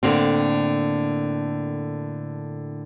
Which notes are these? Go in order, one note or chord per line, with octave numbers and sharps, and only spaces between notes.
A2 D3 A#3 C4